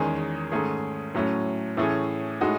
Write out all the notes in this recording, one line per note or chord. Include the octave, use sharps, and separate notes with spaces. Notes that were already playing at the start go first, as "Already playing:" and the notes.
Already playing: E2 D#3 G#3 C#4 G#4
G#2 D#3 A3 C#4 G#4
A2 F#3 A3 C#4
A2 E3 A3 C#4 G#4
A2 G#3 D#4 F#4